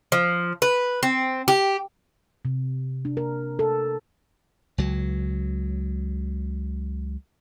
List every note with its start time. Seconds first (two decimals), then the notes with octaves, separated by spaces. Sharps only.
0.12 F3
0.62 B4
1.03 C4
1.48 G4
2.45 C3
3.05 D4
3.17 A#4
3.59 A4
4.78 C#2 F#3